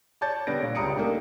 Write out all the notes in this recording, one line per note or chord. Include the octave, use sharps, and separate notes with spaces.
C#5 D5 A5 G6 A6
D3 G3 B3 A#6 D7
A#2 C#5
C#2 G3 A#5 D#6 C#7 D7
A3 A#3 D4 D#4 G4